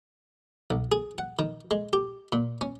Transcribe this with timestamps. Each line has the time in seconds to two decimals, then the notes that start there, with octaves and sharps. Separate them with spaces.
0.70 B1
0.92 G#4
1.18 F#5
1.39 D#3
1.71 G#3
1.93 G4
2.32 A#2
2.61 C#4